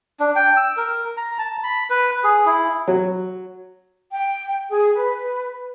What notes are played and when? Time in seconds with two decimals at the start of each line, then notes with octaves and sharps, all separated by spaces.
0.20 D4
0.36 G5
0.57 E6
0.77 A#4
1.17 A#5
1.38 A5
1.63 B5
1.90 B4
2.24 G#4
2.46 E4
2.88 F#3
4.11 G5
4.69 G#4
4.95 B4